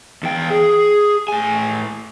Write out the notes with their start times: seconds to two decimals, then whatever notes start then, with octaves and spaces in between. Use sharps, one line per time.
0.23 E2 G5
0.50 G#4
1.28 A2 G#5